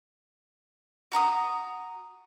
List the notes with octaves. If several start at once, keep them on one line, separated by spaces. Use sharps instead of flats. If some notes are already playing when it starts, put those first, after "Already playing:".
F#4 A#5 C#6 D#6